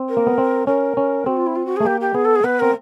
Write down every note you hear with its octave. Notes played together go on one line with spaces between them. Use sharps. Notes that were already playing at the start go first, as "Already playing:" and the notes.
Already playing: C4
A#4
A#3
B3
C4
C#4 A#4
C#4
C4 F#4
F4
E4
F4
F#4
A3 G#4
A#3 G4
G4
B3 G#4
A4
G#4
B3 B4
C4 A#4